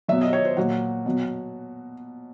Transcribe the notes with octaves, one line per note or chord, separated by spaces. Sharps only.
B2 F#3 E5
D#5
C#5
C5
A#2 F#3 F#4
B2 F#3